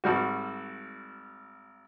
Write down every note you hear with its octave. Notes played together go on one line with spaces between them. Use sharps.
G#1 G3 F#4